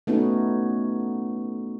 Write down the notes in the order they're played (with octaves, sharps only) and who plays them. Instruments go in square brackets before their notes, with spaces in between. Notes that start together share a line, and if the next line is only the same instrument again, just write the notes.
[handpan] A3 B3 C#4 D#4 F#4